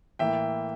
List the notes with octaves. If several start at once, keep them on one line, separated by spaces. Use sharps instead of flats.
A2 E3 A#3 E5 G5